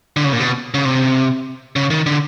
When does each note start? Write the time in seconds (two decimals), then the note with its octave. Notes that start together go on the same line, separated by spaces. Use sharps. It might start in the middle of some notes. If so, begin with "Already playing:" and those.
0.16 D3
0.25 C#3
0.33 A#2
0.40 B2
0.74 C#3
0.85 C3
1.76 C#3
1.90 D#3
2.06 D3